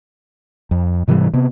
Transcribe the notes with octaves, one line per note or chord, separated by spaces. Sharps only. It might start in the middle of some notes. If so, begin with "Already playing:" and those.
F2
G#2 C3 E3 G3
C3 B3